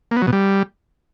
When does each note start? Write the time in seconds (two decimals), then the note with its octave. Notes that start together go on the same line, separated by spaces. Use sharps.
0.11 A#3
0.17 B3
0.22 F#3
0.27 B2
0.33 G3